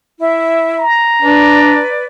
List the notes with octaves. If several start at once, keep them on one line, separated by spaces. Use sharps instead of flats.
E4 E5
A#5
D4 B4 D5